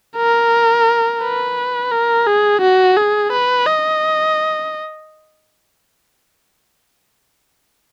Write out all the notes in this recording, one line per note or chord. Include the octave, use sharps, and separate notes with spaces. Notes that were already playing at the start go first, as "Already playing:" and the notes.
A#4
B4
A#4
G#4
F#4
G#4
B4
D#5